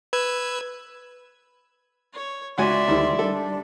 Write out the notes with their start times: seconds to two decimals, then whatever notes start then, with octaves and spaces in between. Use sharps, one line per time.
0.13 B4 E6 G#6
2.13 C#5
2.58 C#2 F#4 D5 E5 G#5 C6
2.88 D2 D#3 G3 E4
3.19 G3 D4 A4